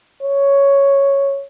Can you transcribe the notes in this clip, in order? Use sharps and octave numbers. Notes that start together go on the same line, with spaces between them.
C#5